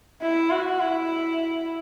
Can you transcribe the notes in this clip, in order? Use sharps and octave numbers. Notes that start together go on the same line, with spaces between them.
E4
F#4
E4